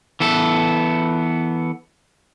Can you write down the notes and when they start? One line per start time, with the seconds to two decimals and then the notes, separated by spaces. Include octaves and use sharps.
0.20 E3 B3 A4